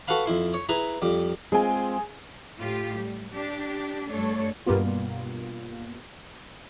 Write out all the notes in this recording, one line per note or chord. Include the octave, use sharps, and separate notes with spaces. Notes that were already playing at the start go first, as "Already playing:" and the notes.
F#4 A4 B4 F5 B5
F2 E4 C6
C#5
E4 G#4 B4 A#5
F2 G3
G#3 C4 F4 G#4 G#5
A2 F4 G4
G3
D4 G4
G2 A3 D4 A4 C#5
G2 B2 G3 A#3 B3 F4